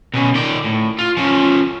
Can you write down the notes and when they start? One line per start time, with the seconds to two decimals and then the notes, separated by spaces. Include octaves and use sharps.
0.14 B2 C#4
0.35 D#3 D5
0.64 A2
0.99 F4
1.17 F3 C#4